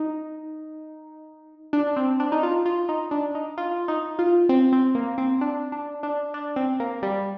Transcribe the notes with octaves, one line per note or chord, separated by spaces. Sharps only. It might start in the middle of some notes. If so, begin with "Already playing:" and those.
Already playing: D#4
D4
C4
D4
D#4
F4
F4
D#4
D4
D#4
F4
D#4
F4
C4
C4
A#3
C4
D4
D4
D4
D4
C4
A#3
G3